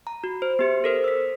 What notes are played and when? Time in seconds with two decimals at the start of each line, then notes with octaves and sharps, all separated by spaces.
0.07 A#5
0.24 F#4
0.42 C5
0.59 B3 G4 C#7
0.84 A4 A#4 C5
1.04 E6 B6